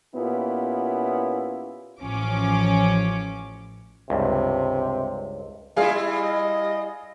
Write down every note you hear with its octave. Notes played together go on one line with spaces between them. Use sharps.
A#2 B3 C#4 E4 F4 G4
A1 F3 C#4 D6
C#2 G2 C3
G3 E4 F4 G#4 F5
D#5